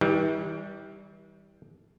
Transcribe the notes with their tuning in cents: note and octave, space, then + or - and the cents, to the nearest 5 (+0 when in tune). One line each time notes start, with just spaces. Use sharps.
E3 -40 G3 +0